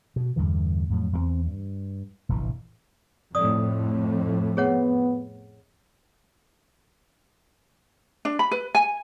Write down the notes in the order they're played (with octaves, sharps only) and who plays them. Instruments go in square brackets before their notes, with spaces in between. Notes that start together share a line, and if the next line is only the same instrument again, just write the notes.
[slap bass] B2
E2 G2 D3 E3
F2 A2 F#3
E2 G3 C4
G2
F1 A#1 A2 E3
[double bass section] F2 A2 [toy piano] D5 D#6
[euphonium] B3 [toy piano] G#4 C#5 F#5
[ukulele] D4
B5
B4
G#5